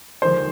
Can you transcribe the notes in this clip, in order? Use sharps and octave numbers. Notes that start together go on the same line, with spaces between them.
F1 D#2 D3 F3 G#3 C5